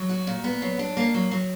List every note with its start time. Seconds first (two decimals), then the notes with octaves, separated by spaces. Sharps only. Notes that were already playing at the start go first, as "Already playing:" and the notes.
Already playing: F#3
0.09 F#4
0.27 A#2
0.44 B3
0.62 F#3
0.79 D4
0.97 A#3
1.14 F#3
1.31 F#3